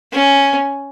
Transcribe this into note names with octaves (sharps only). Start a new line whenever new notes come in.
C#4